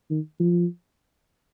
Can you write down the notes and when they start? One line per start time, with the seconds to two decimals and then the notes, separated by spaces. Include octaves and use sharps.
0.10 D#3
0.40 F3